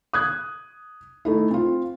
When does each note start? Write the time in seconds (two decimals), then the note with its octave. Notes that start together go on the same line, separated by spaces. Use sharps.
0.13 D#6 F#6 G#6
1.25 A3 D#4 E4
1.51 C4 F4